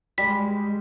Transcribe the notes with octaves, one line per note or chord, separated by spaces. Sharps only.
G3 G#3 B6